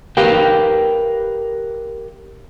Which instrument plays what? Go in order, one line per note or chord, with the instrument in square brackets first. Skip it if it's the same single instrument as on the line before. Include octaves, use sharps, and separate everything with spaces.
[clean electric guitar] G4 A#4 B4 F5 G5